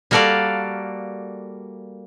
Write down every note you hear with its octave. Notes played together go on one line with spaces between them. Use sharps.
G3 A#3 F#4 A4 D5 F5